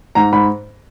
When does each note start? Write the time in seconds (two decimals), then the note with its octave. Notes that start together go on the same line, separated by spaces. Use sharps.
0.15 G#2 A#5
0.32 G#2 B5